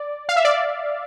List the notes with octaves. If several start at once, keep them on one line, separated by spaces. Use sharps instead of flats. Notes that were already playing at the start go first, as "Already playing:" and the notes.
Already playing: D5
F5
E5
D5